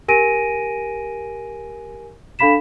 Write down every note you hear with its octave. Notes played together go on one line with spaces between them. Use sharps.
G4 A#4 G#5 A#6 D7 D#7
D4 A4 F5 B5 B6 E7